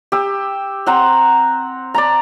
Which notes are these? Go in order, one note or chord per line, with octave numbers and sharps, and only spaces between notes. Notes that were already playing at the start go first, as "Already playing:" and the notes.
G4 E6
C4 C5 F#5 A#5
D5 A5 A#5